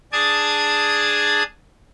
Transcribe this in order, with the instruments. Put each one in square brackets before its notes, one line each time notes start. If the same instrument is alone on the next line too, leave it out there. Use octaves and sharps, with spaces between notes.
[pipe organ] D4 G#4 D5 A5 D#6 G#6